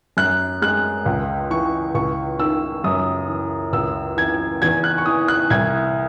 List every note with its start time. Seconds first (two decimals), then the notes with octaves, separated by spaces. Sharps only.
0.17 F#2 F#6
0.62 G#3 F#6
1.06 C#2
1.50 E3 C#6
1.95 C#2 C#6
2.39 D#3 E6
2.84 F#2 D#6
3.28 E3
3.73 C#2 E6
4.17 E3 G#6
4.62 E2 G#6
4.84 F#6
4.98 C#6
5.06 E3 D#6
5.28 F#6
5.50 C2 G#6